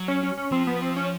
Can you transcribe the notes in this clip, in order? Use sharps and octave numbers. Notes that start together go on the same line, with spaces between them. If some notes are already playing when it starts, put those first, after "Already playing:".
Already playing: F#3
C#4
C#4
C#4
F3 C4
B3
C4
C#4